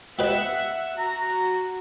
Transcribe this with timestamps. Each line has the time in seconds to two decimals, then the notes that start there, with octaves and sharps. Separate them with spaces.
0.19 G4 B4 D#5 E5 F#5
0.98 F#4 A#5